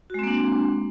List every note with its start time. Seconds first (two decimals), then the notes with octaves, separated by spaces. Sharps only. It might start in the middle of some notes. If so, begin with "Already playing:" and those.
0.10 F#4
0.14 G#3
0.19 C4
0.23 A#3
0.28 D4